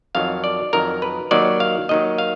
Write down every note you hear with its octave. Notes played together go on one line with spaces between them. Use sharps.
F2 D#3 F#3 F5
D5
F2 D#3 F#3 A#4
B4
D#2 D#3 F#3 D5
F5
D#2 D#3 F#3 D#5
F5